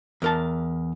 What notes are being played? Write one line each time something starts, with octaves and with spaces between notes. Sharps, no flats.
E2 A#4 A5